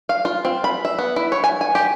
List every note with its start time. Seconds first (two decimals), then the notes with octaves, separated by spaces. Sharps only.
0.09 F5
0.25 F4
0.45 C4
0.64 B5
0.85 E5
0.99 B3
1.16 E4
1.32 C#5
1.44 G#5
1.61 G#5
1.75 G4